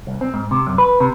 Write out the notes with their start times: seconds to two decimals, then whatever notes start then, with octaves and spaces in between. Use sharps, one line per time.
0.07 C2
0.21 C4
0.34 G#2
0.51 C3
0.67 F#2
0.78 B4
1.00 C3